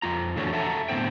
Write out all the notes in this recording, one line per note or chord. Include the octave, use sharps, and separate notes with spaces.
F2 F4 A#5
E2 D3 A3 D4 F#4 C#5
A4 E5 F#5 A5 A#5
A2 D3 B3 C4 C5 G5